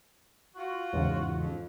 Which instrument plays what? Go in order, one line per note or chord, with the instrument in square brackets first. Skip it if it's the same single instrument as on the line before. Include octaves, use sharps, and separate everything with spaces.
[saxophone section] F4 F#4
[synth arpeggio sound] E2 G#2 C#3
[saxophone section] F2